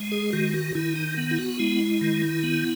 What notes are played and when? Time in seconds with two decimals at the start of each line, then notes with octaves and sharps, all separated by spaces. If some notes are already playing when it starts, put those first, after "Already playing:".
Already playing: G#3
0.12 G#4
0.32 D#3 F#4
0.54 F#4
0.75 D#3 E4
0.96 D#4
1.17 B3
1.31 E4
1.38 F#4
1.59 G#3 E4
2.01 D#3
2.43 B3